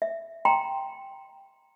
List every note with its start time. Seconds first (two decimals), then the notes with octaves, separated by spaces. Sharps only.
0.02 E5
0.45 G5 A#5 C6